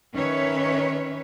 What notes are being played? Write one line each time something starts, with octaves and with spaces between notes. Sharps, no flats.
D#3 C#4 B4 C#5 E5